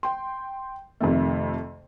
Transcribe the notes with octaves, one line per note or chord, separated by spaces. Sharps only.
G5 C6
F2 C3 D#3 A3